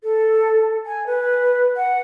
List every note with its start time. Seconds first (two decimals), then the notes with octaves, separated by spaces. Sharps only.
0.03 A4
0.86 G#5
1.07 B4
1.77 F#5